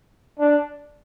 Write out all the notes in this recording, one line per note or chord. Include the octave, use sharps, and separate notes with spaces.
D4